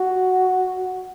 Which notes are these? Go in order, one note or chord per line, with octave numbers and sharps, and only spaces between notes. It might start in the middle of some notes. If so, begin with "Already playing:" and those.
Already playing: F#4